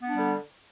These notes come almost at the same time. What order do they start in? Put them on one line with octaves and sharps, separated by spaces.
B3 D4 G3 D3